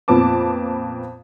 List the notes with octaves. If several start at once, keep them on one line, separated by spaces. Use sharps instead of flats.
F2 A#2 B3 A5 D6